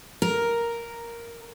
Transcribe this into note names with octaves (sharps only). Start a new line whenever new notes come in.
A#4